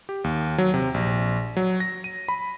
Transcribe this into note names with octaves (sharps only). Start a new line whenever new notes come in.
G4
D#2
F#3
C3
A#1
F#3
A#6
D#7
B5